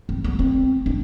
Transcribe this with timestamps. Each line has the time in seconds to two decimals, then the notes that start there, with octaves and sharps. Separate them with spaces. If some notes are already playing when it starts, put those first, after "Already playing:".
0.09 C4
0.24 B3
0.39 C4
0.86 D4